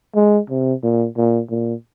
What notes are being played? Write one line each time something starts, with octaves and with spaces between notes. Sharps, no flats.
G#3
C3
A#2
A#2
A#2